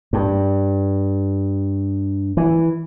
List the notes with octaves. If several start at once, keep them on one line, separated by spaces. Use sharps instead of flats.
G2
E3